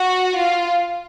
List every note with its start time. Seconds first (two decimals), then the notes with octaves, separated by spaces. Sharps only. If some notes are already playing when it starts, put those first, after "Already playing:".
Already playing: F#4
0.38 F4